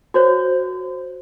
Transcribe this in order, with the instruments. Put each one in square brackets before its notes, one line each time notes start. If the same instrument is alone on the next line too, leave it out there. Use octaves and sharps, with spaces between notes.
[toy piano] F#4 C5 C#5